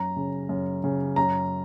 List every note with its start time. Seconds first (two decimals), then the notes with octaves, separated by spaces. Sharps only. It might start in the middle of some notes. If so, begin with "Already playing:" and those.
Already playing: F#2 A#5
0.16 C#3
0.49 F#2
0.84 C#3
1.16 F#2 A#5